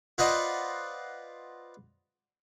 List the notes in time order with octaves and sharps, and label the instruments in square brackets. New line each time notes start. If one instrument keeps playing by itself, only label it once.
[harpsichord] F4 B4 C5 D5 D#5 F#5